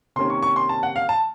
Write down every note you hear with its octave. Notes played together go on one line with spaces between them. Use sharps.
C3 D#3 A#3 C#4 C6
C#6
C#6
C6
A5
F#5
F5
A5